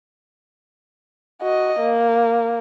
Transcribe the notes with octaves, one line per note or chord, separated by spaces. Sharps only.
F#4 D#5
A#3